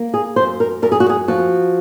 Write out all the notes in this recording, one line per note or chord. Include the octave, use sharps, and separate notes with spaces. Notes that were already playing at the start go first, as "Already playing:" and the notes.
Already playing: A#3
G#4
F#2 C5
A#4
F#2 A#4
G#4
F#4
G#4
F3 F#4